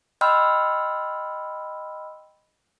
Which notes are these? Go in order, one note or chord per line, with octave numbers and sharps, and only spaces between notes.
D#5 G5 B5 C6 E6 F6